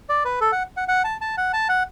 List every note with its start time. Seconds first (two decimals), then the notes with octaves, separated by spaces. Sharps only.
0.09 D5
0.25 B4
0.41 A4
0.52 F#5
0.77 F#5
0.88 F#5
1.04 A5
1.21 A5
1.37 F#5
1.53 A5
1.69 F#5